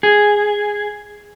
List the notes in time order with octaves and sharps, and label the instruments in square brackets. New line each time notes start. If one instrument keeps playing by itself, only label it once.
[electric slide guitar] G#4